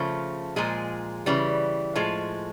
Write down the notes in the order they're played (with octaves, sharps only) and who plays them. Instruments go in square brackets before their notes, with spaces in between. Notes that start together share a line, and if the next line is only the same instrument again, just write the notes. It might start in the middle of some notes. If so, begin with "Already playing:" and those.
Already playing: [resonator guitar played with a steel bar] C#3 F3 A3
A#2 F3 G#3 G#4
C#3 E3 G3
A2 F3 G#3